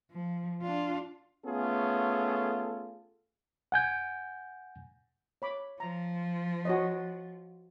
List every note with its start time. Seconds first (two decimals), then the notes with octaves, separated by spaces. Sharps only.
0.11 F3
0.62 D4 F4
1.46 A3 B3 C#4 F4 G#4 A4
3.72 F#5 G#5 G6
5.42 C#5 B5 D6
5.80 F3 A#5
6.65 F#4 C#5 D#5